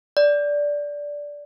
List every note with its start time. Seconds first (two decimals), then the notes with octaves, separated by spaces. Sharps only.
0.17 D5